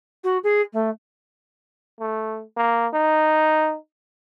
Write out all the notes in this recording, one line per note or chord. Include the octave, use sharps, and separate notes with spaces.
F#4
G#4
A3
A3
A#3
D#4